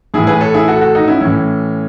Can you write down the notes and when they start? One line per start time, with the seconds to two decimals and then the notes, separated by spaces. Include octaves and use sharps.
0.14 A2 E3 E4 G#4
0.27 G#4 B4
0.41 A4 C#5
0.54 E4 G#4
0.68 F#4 A4
0.81 F#4 A4
0.95 D#4 F#4
1.08 C#4 E4
1.21 A2 E3 C#4